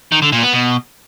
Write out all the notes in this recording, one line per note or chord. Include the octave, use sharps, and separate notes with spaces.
D#3
D3
A#2
B3
B2